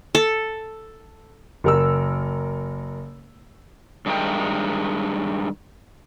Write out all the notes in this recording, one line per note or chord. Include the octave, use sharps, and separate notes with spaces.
A4
F#1 A#4 E6
G2 D#3 G#3 A3 A#4 G5